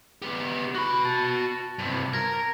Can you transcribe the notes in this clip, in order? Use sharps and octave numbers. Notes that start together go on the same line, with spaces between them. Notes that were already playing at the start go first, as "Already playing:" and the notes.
B3 G4
F#4 B5 C#6 F#6
A5 A6
G2 C3
A#4 G#6 A#6